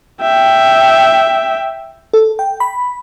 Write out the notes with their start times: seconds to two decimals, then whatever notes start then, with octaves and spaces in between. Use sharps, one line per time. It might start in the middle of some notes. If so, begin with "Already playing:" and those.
0.22 E5 G5
2.13 A4
2.39 G5
2.60 B5